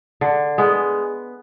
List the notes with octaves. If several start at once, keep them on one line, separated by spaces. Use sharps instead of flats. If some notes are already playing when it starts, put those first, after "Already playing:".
D3
G#3 B3